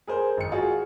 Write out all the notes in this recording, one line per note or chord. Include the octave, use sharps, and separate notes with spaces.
G#4 A#4 C5
G#1 C#7
F4 F#4 G#4